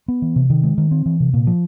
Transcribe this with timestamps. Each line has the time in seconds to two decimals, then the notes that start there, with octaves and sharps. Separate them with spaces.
0.08 B3
0.22 E3
0.36 C3
0.50 D#3
0.63 G#3
0.78 D#3
0.91 C4
1.06 E3
1.20 C3
1.34 A#2
1.47 F3